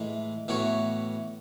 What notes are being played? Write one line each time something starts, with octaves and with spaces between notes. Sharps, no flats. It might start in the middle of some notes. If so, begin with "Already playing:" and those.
Already playing: A2 E3 G#3
A2 E3 B3 F#4 C#5